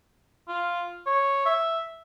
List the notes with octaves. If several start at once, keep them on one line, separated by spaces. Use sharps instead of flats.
F4
C#5
E5